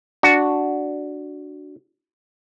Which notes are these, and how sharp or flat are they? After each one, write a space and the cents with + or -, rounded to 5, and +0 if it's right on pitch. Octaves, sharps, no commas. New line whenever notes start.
D4 +0 F#4 +0